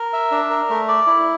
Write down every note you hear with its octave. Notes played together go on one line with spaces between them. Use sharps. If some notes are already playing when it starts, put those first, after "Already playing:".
Already playing: A#4
E5
D4
A#4
A3
D5
E4